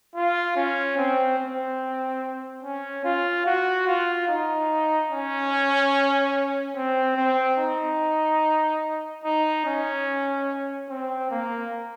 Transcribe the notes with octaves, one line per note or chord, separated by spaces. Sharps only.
F4
C#4
C4
C4
C#4
F4
F#4
F4
D#4
C#4
C4
C4
D#4
D#4
C#4
C4
A#3